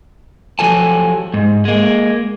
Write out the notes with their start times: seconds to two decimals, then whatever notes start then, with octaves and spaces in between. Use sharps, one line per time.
0.59 F3 F#3 G4 A4 G#5 A5
1.34 G#2
1.65 G#3 A#3